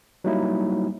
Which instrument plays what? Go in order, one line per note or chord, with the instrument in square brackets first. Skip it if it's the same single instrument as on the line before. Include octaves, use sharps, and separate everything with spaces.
[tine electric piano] F#3 G3 A#3 D#4 E4